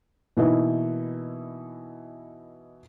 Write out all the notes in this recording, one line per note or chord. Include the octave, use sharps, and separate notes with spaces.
B2 E3 A#3 D#4 E4